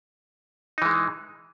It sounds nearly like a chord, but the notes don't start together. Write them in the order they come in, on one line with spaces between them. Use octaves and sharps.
D#4 E3 G#3